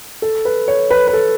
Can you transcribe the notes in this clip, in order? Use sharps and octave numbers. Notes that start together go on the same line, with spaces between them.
A4
B4
C#5
B4
B4
A4